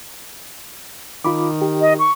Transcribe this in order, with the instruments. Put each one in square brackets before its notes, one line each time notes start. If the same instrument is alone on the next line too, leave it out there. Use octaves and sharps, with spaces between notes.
[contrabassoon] D#3 [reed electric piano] F4 B5 D6
[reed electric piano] G4
[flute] D#5
C#6